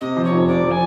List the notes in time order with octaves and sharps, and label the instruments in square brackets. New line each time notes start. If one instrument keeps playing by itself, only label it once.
[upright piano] C3 [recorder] D#5
[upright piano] F3
[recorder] C#5
[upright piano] F1
[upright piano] C3 [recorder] D5
[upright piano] F3
[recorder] G#5